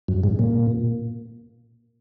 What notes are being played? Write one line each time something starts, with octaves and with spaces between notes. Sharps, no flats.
F#2
G#2
A#2